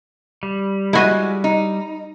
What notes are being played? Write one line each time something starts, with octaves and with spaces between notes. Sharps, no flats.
G3
G#3 E4 F#4 D#5
D#4